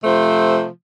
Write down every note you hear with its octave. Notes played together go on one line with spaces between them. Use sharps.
C3 F3 A3 C5